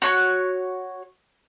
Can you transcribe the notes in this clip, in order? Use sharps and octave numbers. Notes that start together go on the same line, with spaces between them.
F#4 C#5 F#6